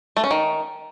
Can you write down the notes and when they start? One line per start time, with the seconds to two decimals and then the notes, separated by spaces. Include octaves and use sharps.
0.17 A3
0.24 C#4
0.31 D#3